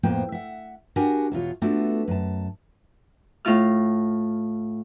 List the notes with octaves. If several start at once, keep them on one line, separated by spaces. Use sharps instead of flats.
F2 A2 A#3 B3 C5 G5
E5 F#5
D4 F#4 G4 A#4 F#5 G#5
E2 B2 F4 C#5
A3 B3 D4 F4 F#4 A4
F#2 A5
A2 E4 F4 F6